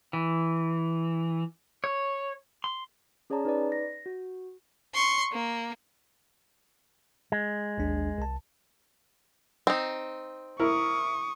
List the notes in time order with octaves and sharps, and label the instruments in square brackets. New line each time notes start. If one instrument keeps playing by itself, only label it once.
[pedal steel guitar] E3
C#5
C6
[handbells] C#4 G#4 C#5 D5 A5 A#5
D#4 B4 D5
A#6
F#4
[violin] C6 C#6
A#3
[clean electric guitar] G#3
[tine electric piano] A1 D#2 D4
C2 A5
[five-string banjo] C4 D#4
[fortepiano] E4 A#4 [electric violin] C#6 D#6